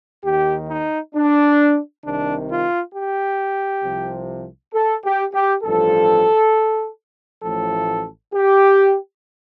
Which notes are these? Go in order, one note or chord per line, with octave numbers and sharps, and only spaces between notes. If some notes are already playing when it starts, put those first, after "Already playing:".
D#2 D#3 G4
D#4
D4
C2 C3 D#3 D4
F4
G4
C2 C3 F3
A4
G4
G4
A1 G2 F3 A4
A1 A2 F3 A4
G4